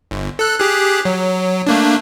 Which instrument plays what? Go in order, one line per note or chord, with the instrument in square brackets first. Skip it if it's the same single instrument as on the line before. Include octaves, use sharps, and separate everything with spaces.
[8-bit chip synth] G1
A4 F#6
G4 G#4 F#6
F#3
A3 A#3 D4